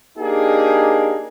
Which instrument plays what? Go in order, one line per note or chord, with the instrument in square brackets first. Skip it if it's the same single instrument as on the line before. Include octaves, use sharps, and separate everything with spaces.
[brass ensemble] A#3 D4 D#4 G4 G#4